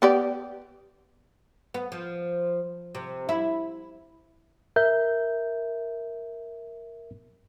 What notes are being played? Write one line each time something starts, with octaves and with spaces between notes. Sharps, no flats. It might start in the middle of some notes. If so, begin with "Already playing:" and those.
B3 G4 D5
B3
F3
C3
E4
A#4 E5 G6